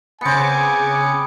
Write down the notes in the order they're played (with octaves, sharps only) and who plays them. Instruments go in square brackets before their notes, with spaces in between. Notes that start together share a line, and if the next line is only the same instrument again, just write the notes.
[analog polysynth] C#3 D6 C#7 [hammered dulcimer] B3 C4 [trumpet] G#5